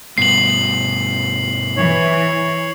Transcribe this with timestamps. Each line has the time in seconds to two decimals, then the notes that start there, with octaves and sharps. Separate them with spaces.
0.18 G2 B2 C7 F#7
1.77 E3 C#5